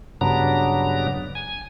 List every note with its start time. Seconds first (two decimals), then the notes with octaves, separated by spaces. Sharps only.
0.21 G2 C#3 F#3 B3 D4 A#5
1.35 G#5